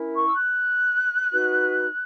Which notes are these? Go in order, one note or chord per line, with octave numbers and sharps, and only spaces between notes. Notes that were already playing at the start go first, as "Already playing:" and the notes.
Already playing: C#4 E4 A#4
C#6
E6
F#6
D#4 F#4 B4